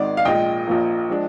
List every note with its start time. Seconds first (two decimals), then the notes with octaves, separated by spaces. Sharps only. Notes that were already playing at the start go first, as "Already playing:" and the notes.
Already playing: G#1 G#2 D#3 D5
0.17 F5
0.25 A#1 A#2 G#3 D#5 G5
0.67 A#1 A#2 F3 A#3
1.09 F3 G#3 D4